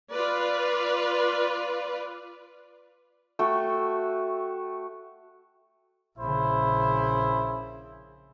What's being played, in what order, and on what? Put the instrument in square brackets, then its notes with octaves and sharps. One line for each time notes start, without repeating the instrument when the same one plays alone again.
[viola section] F4 B4 D5
[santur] A3 F#4 G5
[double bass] A#1 C#3 [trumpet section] E4 C5 B5